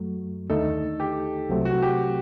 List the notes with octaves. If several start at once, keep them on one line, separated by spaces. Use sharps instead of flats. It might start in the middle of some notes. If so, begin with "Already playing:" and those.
Already playing: F#2 F#3 A3
D#2 D3 A3 D#4 A4
G4
C2 C3 F#3 A3 C4
F#4
G4